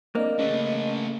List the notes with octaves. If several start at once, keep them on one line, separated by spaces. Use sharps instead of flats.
A#3 C4 D4 D5 D#5
C#3 A3 B4